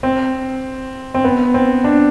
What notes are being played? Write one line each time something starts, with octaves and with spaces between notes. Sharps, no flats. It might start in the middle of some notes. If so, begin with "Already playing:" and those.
C4
C4
B3
C4
D4